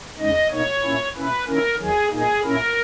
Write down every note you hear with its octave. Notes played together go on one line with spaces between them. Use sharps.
E2 C#3 G#3 D#4 D#5
B2 A#3 D#4 C#5
A#2 A#3 C#4 E4
B2 A#3 C#4 E4 B4
D#3 A#3 C#4 E4 A#4
D#2 D#3 F#3 G#4
A#2 A#3 D#4 G#4
A#2 A#3 C#4 E4 A#4